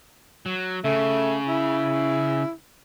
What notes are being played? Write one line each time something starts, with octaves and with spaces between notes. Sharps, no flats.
F#3
C#3 A3
E4